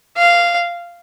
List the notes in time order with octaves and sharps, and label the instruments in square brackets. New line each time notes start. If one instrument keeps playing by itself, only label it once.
[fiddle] F5